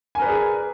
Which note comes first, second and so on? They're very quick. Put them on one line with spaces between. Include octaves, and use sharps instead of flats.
G#5 A#4 B4 D5 G#4